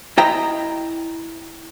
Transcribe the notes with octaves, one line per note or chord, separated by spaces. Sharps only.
E4 D#5 G5 A#5